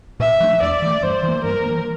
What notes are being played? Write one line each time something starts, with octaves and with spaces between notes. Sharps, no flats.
A#2 E5
F3 A3 D4
E2 D5
E3 A3
G2 C5
E3
A#3
G2 A#4
E3 A#3